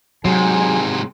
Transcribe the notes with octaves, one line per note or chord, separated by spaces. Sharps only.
G#2 C3 F#3 G#4 G#5